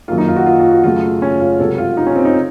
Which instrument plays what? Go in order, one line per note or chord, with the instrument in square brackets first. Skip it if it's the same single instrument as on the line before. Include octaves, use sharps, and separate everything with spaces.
[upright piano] F#2 D#3 A#3 F4
D#4
F4
F#4
F4
F4
F#4
F#2 C#3 F#3 A3 F4
C#4
F4
C#2 C3 F#3 A4
F4
D#4
C#4
C4
D#4